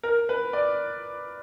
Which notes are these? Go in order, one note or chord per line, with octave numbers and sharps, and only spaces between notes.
A#4
B4
D5